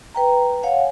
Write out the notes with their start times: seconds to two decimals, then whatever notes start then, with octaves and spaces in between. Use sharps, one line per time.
0.15 B4 G5 A#5
0.63 C#5 F5 F#5 G#5